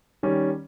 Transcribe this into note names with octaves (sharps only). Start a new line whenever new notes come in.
D#3 G3 C#4